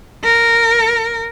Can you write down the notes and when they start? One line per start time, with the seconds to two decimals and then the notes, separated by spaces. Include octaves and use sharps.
0.24 A#4